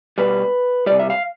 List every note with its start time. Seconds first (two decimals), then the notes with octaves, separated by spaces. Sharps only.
0.18 B2 G3 B4
0.86 C3 G3 D5
0.99 E5
1.10 F5